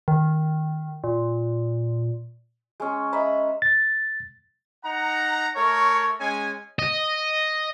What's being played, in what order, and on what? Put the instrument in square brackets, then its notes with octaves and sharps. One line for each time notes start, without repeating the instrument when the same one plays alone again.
[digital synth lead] D#3
A#2
[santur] G#3 C#4
D#5 E5 A#5 B5
[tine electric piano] A6
[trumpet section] D#4 F#5 A#5
A3 A#4 C#5
G#3 C#4 G#5
[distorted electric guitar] D#5